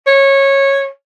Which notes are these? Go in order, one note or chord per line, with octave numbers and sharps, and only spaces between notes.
C#5